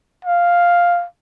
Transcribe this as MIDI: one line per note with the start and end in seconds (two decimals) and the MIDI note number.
0.25 1.05 77